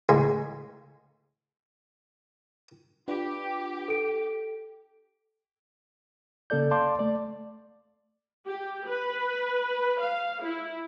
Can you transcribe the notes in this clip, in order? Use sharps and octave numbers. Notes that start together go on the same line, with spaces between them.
A1 C#3 G#3 G#5 B5 C6
D4 F4 G4 B4
A4 D7
C#3 A#3 A4 D5 G6
D5 F5 A5 C6 D6
A3 D5
G4
B4
F5
E4